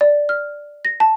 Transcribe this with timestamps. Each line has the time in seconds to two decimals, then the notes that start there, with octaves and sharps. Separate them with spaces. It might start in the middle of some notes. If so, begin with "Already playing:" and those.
0.01 D5
0.29 F6
0.85 A#6
1.00 A5